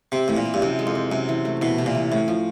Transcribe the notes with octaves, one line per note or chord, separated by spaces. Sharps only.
C3 C4
A2 E3
A#2
C4
G2
F#2 C3
G#3
F2
C4
F#2 C3
E3
A3
B2 E3
C3
A#2
E3
A2 C#4
F3